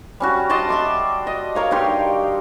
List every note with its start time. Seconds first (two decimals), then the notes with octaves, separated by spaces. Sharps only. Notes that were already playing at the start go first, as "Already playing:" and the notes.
0.20 G3 C#4 F#4
0.50 D5 D#5 A5 C6
0.69 E5 C6 D6
1.27 D#5
1.55 A#4 C#5 F5
1.71 G2 D#4 G4 C6